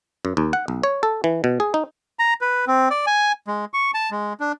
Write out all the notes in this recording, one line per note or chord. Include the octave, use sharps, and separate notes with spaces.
F#2
D#2
F#5
B1
C#5
A4
E3
B2
G#4
D#4
A#5
B4
C4
D5
G#5
G#3
C#6
A5
G#3
D4